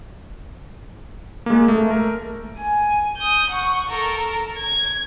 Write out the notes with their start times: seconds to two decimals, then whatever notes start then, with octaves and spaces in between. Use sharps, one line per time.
1.46 G#3 A#3
1.68 A3
1.91 A#4
2.57 G#5
3.17 D#6 G6
3.50 F#5 C#6
3.89 A4 A#4
4.57 G#6